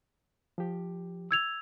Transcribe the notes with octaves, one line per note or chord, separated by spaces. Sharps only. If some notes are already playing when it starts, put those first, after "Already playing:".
F3 G4
E6 G#6 F7